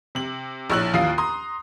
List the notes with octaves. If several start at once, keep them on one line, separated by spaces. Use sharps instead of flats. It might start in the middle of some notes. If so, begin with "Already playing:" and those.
C3 F#7
A#1 A2 C#5 E6 F#6 F#7
A1 D#2 F4 F5 D#6 C7
A#5 C6 D#6